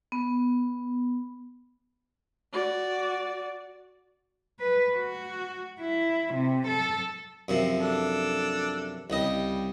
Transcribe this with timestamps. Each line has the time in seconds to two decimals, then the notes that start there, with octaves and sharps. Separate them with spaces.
0.12 B3
2.53 F#4 D5
4.59 B4
4.97 F#4
5.81 E4
6.34 C3
6.67 A4
7.48 F#2 C3 F3
7.80 D4 A4
9.10 C2 C#3 G3 D#5